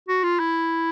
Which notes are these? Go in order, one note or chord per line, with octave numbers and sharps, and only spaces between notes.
F#4
F4
E4